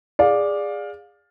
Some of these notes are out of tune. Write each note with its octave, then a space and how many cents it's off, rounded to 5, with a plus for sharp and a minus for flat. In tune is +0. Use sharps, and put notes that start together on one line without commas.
G#4 -15 D5 +0 F5 +20